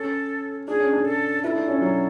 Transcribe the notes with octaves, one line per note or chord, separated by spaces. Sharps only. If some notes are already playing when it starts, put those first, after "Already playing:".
Already playing: C#4 A4
D4 G#4
C#4
D4
A4
E4 A4 B4
D4
C#4
F#3